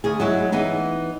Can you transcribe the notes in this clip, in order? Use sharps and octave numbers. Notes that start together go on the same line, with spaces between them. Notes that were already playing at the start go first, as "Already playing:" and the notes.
D2 G#4
F#3 G#3 E4
E3 B3 D#4